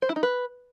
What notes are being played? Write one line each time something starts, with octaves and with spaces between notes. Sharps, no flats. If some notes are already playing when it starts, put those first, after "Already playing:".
C5
E4
D#4
B4